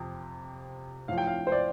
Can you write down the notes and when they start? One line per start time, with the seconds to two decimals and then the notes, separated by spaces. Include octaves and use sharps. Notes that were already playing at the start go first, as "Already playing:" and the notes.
Already playing: F2 C3
1.08 A2 F3 F5
1.18 G5
1.27 F5
1.47 C5
1.52 D5